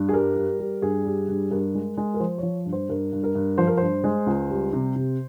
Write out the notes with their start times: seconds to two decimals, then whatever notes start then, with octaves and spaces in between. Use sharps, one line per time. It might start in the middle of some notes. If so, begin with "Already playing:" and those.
Already playing: G2
0.09 G#4
0.13 G3 A#4
0.36 G3
0.59 G3
0.82 G2 G#4
1.05 G3
1.28 G2
1.51 G2 A#4
1.75 G#3
1.97 G#3
2.14 A#4
2.20 F3 C5
2.38 F3 C#5
2.66 G2
2.72 C5
2.89 G2 A#4
3.13 G2
3.23 A#4
3.35 G2
3.58 F3 C5
3.67 A#4
3.77 G2 C5
4.04 G#3
4.26 C#2
4.50 G3
4.73 C3
4.96 C3